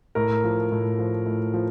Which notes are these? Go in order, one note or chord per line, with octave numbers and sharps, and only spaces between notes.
A2 A#4
F3
A2
F3
A2
F3